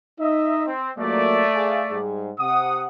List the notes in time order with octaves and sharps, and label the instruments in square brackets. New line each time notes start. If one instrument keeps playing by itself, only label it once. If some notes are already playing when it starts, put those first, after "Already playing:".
[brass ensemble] D#4 [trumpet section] D#5 E5
[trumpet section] C4
[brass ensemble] C#2 F#3 A#3 [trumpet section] A3 D5
[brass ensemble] G#4 E5 F5
G#2 G3 G#4
[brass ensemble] C3 F#5 [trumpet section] D#6